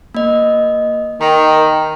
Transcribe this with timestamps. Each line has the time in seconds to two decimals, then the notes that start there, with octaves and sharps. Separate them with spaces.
0.15 A#3 D#5
1.21 D#3 G5 A#5 B6